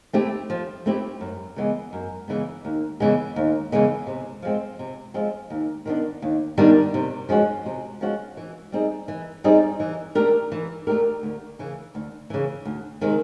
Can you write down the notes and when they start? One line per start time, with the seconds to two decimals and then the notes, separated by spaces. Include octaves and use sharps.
0.13 A3 C4 E4 G4
0.50 F3
0.86 A3 C4 E4 G4
1.21 F#2
1.56 C#3 E3 G#3 B3
1.93 F#2
2.28 C#3 E3 G#3 B3
2.65 D#2
3.00 C#3 E3 G#3 B3
3.36 D#2
3.72 C#3 E3 G#3 B3
4.07 C3
4.42 F3 G#3 C4
4.79 C3
5.14 F3 G#3 C4
5.50 D#2
5.86 D#3 G3 B3 D4
6.22 D#2
6.58 D#3 G3 B3 D4
6.94 C3
7.29 F3 G#3 C#4 F#4
7.66 C3
8.01 F3 G#3 C#4 F#4
8.37 E3
8.72 G3 C4 D#4 G#4
9.08 E3
9.44 G3 C4 D#4 G#4
9.80 E3
10.15 A3 D4 G4 A#4
10.52 E3
10.87 A3 D4 G4 A#4
11.23 D2
11.59 C#3 E3
11.95 D2
12.30 C#3 E3
12.65 D2
13.01 C3 D#3 G#3